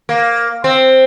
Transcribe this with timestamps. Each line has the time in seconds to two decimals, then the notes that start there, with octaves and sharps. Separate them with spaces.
0.09 A#3
0.64 C4